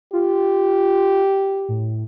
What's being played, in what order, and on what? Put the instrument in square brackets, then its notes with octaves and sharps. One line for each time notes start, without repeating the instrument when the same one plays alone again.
[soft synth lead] F4 [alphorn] G4
[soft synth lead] A2